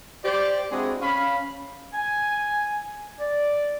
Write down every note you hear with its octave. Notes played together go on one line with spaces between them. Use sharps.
G4 C5 D5
G#3 C4 D4 E4 F#4 G#4
C#4 F5 B5
G#5
D5